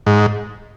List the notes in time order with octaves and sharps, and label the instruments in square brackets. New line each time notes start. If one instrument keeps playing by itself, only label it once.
[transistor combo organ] G#2